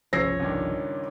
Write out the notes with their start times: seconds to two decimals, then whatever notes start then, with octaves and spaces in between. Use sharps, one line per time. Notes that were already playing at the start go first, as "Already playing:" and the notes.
0.13 G1 C2 C#3 F3 C#5 E6 A#6 C7
0.40 C#2 G2 D#3